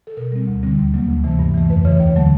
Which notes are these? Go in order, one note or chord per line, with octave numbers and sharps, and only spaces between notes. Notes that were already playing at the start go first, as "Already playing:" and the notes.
A4
B2 A#4
G3 C4
D2
D3 G3 C4
D#2
C#3 F#3 A#3
D2
C3 E3 A3
G2
E3 A3
F2 B4
C#3 E3 C#5
D#2 C#5
D3 F#3 A3